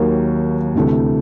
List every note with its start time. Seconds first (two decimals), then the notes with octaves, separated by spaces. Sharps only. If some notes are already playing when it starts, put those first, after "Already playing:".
Already playing: D#2 D#3 F#3 A#3
0.75 D2 C3 E3 A3